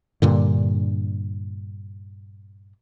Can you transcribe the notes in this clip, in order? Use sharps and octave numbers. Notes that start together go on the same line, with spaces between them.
G2 A#2 D3